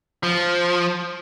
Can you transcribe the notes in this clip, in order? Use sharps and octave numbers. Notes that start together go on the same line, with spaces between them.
F3